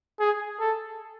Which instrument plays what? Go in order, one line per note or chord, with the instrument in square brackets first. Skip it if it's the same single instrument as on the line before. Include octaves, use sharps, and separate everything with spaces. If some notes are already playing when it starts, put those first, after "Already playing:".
[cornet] G#4
A4